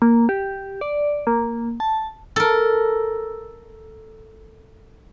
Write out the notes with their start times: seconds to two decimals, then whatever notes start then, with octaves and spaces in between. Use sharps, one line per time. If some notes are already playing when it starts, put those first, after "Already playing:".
0.02 A#3
0.29 G4
0.81 D5
1.27 A#3
1.80 A5
2.36 A4 A#4